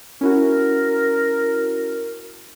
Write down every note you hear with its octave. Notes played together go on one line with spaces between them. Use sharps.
C#4 E4 F#4 A#4